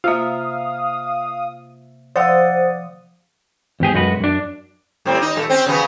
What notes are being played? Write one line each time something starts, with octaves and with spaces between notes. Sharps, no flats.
C3 A#3 F4 E5 F5 D#6
F3 C5 D5 F5 F#5 D#6 E6
E2 G#2 G4 G#4
B1 F#2 G#3 F#4 B4
F#2 D4
A2 G3 C4
D#4
A#2 G#3 A3
C4 C#4
C#3 F#3 B3